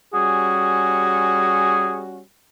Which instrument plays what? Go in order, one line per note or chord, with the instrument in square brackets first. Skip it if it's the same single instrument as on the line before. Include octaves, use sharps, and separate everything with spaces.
[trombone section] G3 C#4 F#4 [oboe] G#4